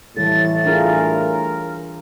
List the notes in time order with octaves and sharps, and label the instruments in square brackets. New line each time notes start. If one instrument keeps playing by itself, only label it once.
[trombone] A2 [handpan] E3 G3 A4 [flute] A6
[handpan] D4 F4 G#4 [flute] A#4